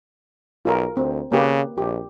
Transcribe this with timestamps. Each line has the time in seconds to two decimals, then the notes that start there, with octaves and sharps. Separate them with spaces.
0.65 B1 F4 G#4 A#4
0.97 D2 C4
1.32 C#3 A#3 G4 B4
1.78 A#1 G4